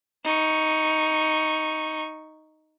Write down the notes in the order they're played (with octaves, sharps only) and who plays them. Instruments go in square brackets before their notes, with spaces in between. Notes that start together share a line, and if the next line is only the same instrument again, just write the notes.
[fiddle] D#4 C#6